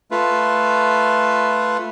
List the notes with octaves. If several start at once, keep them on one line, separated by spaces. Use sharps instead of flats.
A3 F4 B4